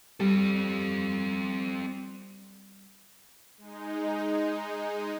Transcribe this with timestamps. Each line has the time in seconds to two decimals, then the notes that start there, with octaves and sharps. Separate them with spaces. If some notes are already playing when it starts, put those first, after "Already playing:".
0.20 G3 C4 A4
3.58 G#3 D#4